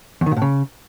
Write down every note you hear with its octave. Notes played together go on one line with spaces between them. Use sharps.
E2
D#3
A#2
A2
C#3